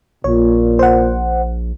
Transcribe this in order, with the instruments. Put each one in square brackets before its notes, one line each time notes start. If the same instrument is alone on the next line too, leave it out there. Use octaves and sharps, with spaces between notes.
[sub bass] A#1 [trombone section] A#2 [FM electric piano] C#5
[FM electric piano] C5 F#5